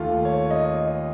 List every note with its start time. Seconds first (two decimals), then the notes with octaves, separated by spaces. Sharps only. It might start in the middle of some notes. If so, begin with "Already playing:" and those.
Already playing: D#2 D#3 A3 F4
0.25 C#5
0.50 D#5
0.76 D#5